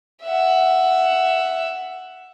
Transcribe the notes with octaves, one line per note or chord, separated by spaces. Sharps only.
E5 F#5